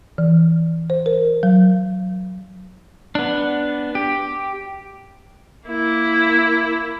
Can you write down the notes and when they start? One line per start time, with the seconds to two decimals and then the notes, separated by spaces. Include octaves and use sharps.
0.18 E3
0.90 C5
1.06 A#4
1.43 F#3
3.15 B3 D4
3.95 G4
5.68 A#3 E4